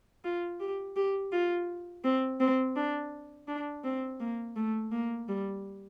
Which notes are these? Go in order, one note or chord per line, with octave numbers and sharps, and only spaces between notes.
F4
G4
G4
F4
C4
C4
D4
D4
C4
A#3
A3
A#3
G3